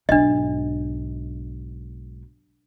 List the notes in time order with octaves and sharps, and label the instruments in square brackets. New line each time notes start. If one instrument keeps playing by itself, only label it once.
[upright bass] B1 G#2 [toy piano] D4 D#5